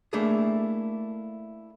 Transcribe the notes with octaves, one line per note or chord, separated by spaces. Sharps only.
A3 A#3 D4 E4 G#4 A4